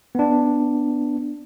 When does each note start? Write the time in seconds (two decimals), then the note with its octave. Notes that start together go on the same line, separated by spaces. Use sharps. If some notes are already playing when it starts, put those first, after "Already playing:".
0.15 B3 D4